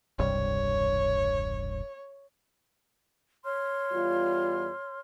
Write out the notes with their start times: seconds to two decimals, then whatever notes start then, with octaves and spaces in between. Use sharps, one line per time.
0.19 E1 C2 G2 C#5
3.44 C#5 C6 F6
3.92 E2 G3 F4